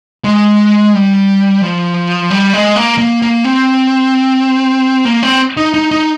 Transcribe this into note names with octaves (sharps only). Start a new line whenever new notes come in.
G#3
G3
F3
G3
G#3
A#3
A#3
A#3
C4
A#3
C4
D#4
D#4
D#4